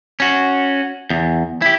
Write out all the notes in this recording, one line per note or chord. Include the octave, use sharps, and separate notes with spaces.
C#4 F#4
E2
E4 G4